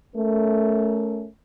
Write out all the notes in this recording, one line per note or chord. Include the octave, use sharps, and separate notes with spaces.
A3 C#4 A#4